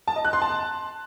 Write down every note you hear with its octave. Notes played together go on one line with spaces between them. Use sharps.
A5
D#5
F#6
C6
A5